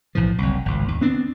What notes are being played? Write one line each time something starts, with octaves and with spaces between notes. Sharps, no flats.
B1 A2 E3 F3
F#1 C2
G#1 C#2
D#2
B3 C4 D4